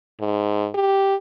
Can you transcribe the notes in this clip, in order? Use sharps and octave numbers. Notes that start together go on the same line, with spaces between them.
G#2
G4